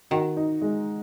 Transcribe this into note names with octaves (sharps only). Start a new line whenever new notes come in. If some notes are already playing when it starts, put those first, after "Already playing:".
D#3 F#4
D#4
G#3